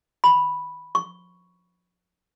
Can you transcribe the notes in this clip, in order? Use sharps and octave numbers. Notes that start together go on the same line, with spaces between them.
B5
C#6